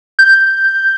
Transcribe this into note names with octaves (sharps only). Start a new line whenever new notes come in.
G6